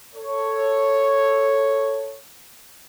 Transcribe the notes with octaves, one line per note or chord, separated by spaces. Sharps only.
A4 C#5